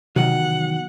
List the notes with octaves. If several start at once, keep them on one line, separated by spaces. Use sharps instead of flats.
E2 C3 D#3 F#3 F#5